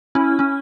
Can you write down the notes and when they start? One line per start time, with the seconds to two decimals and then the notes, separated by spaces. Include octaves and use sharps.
0.15 C#4 E4
0.39 C#4